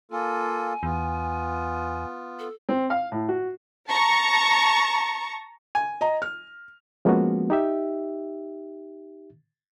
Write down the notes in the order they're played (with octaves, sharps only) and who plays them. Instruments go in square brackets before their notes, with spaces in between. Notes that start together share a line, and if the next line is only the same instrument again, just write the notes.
[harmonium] A#3 F4 A4 [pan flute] G#5
[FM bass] E2 [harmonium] B3 F4
[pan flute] A4
[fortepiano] C4
F5
A2
F#4
[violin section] A5 A#5 C#6
[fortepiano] G#5
[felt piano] D#5 A#5
F6
[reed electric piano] F3 G#3 A#3 B3 C#4 F#4
D#4 G4 E5